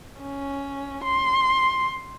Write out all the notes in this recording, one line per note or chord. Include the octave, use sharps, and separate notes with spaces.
C#4
C6